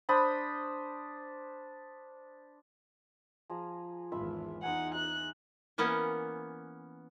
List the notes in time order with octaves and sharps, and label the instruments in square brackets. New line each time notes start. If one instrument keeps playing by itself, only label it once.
[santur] D4 C5 B5 D#6
F3 G#4 A#5
[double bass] G#1 E2 [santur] F4 E5 B5
[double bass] E2 D#4 [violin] F#5 [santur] G#5 A#5 C6
[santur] C5 E5 A#5 [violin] F#6
[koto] E3 A#3 B3 C#4